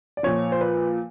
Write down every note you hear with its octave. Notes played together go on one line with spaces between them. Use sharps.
D5
A#2 F3 C#5
C5
B4